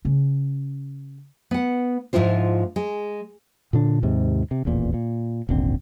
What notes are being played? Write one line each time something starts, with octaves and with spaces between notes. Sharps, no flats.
C#3 C#4
B3 F#5
G#2 F3 E4 F4 C5
G#3
A#2 D3 D4
D#2 G#2 C3
C3
D#1 A1 E2 A#2
A#2
D#1 G#1 D3 C4